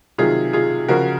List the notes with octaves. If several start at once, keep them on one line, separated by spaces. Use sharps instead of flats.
C3 D#3 F#3 F4 G#4
F4 G#4
C#3 F3 F#4 A#4